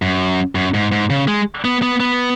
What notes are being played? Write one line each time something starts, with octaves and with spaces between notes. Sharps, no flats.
F#2
F#2
G#2
G#2
C#3
G#3
B3
B3
B3